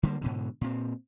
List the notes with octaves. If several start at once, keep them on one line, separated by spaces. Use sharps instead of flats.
D3 G3 A#3
G#2 B2 D3
A#2 C4